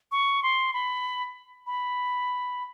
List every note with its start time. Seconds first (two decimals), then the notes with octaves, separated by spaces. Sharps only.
0.12 C#6
0.43 C6
0.74 B5
1.67 B5